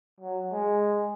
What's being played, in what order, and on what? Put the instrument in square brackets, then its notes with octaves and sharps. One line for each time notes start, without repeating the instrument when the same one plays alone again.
[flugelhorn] F#3
G#3